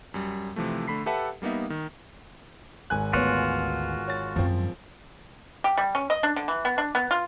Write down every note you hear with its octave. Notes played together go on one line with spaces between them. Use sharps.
F#2 G3
C3 E3 F3 A3
D3 A3 B5 B6 C7
G4 A4 B4 E5 F#5 A5
G3 A#3 B3 D#4 E5
D#3
G#1 G#5 F#6
D2 B3 F4 F#4 C#5
C#5 A6
F#2 F3 F#3 C4
G4
G3
C#4
D#5
D4
D3
E3
B3
D4
B3
F4